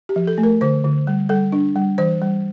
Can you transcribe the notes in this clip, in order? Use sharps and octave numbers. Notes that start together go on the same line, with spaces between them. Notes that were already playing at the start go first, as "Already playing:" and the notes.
G4
F3
A4
A3
A#4
D3 C5
D3
G3
G3 A4
D4
G3
E3 C5
G3